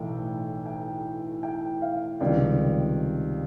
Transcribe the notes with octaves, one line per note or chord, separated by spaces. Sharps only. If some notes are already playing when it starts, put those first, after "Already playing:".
Already playing: B1 A2 E3 A3 G5
G5
G5
F5
C#2 C3 D#3 G3 D5